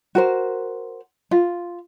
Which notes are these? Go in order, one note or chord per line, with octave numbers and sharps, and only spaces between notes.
F#4 A#4 C5
F4